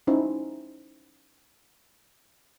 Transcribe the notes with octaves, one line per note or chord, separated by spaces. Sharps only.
C#4 D#4 E4 C5